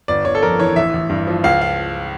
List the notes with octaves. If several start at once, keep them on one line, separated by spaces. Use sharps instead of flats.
G1 D5
G1 C#5
A4
F2 A#4
E3 C#5
A1 E5
A1
G2
F3
C#2 F5
F5